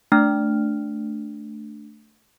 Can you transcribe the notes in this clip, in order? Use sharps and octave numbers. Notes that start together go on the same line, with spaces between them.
A3 D4 F6